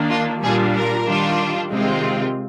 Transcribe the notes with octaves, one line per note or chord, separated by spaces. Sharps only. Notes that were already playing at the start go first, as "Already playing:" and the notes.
Already playing: D#3 A#3 D4
F4
A#2 G3 D4 F4 G#4
A#4
D#3 G3 D4 F4
C3 D#3 G#3 C4 F4